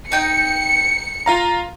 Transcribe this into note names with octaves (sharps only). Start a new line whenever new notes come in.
D#4 G5 C#7
F4 F5 A#5